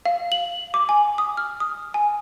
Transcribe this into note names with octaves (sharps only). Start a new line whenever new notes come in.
F5
F#7
D6
G#5
D#6
F6
D#6
G#5